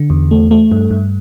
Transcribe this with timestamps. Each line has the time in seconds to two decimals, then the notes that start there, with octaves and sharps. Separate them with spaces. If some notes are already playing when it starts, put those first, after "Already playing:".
Already playing: D3
0.10 E2
0.31 A3
0.51 A3
0.72 G2
0.91 G2